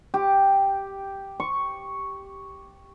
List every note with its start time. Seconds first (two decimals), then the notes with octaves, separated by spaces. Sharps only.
0.14 G4
1.40 C#6